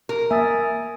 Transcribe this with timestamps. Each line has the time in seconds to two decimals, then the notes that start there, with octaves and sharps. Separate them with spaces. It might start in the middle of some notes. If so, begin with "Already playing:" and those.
0.09 A#4
0.31 A#3 E5 G#5 D#6 A6